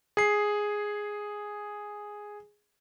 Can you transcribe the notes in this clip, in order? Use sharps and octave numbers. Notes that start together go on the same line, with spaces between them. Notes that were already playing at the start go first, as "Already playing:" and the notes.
G#4 C7